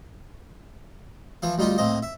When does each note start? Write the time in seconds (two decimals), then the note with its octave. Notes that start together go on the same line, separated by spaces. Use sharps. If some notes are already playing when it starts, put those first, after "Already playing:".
1.42 E3 F3 F5
1.58 D2 G3 D#4 F4 G4
1.78 A2 A#3 C4 D#5
2.02 E5